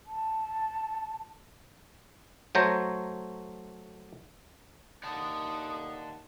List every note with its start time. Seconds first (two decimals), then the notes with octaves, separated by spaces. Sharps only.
0.06 A5
2.55 F#3 A3 C5 C#5 A#5
5.03 D#2 D5 F#5 A5 D#6